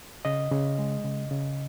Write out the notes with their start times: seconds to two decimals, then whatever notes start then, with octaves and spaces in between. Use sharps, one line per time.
0.25 C#3 D#5
0.51 C#3
0.79 G#3
1.04 C#3
1.31 C#3